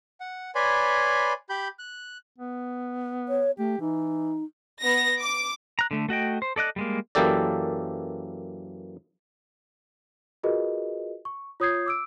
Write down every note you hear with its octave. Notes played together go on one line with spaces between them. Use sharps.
F#5
B4 C#5 D5 G#5 B5 C6
G4 B5 G6
F#6
B3
C#5
A3 G4
E3 D#4
B3 A#6
D6
A#5 F#6
D3 A3
A3 F#4 D#5 G5
C5
A4 D5 D#5 F#6
G3 G#3 A#3
F#2 E3 A#3 G4 A4 D5
F4 F#4 G#4 A#4 B4 D#5
C#6
F4 C#5 D#6 G6 G#6 C7
D6 E6 D7